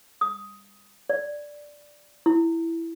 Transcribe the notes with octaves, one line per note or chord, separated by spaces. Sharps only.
D#6
D5
E4